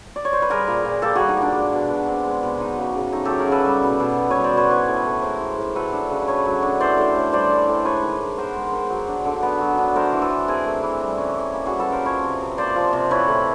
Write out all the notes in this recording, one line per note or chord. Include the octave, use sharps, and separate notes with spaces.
D5
C#5
C5
B4
G3 G#4 A#4
A#2
A#2
A#3 G4 A4
G3 F#4 G#4
D#4
A#2 D4
G#3
B2
B2
C4 D4
G#3
B2
F#3 D#4
C#3
C#3
A3 D#4
F#3 G4 A4
G#4 A#4
C#3 A4 B4
G3
B2
B2
B3
G3 B4 C#5
C5 D5
B2 B4 C#5
E3 B4 C#5
A2
A2
G#3 A#4 C5
E3
A2
F#3 A4 B4
D4
C#3
A3 B4 C#5
F#3
D4
E3 C5 D5
A2
A2
G3 C5 D5
E3
A2
G#3 B4 C#5
D#3
D#3
B3 A#4 C5
G#3
D#3
F#3
D4
D3
B3
F#3
D4
A3 A#4 C5
E3
A4 B4
E3
C4 G#4 A#4
A3
E3
G3
C#4
E3
A#3
G3 F#4 G#4
A4 B4
C#4 A#4 C5
F3 B4 C#5
C3
C3
A#3 C5 D5
F3
C3
E3 B4 C#5
A2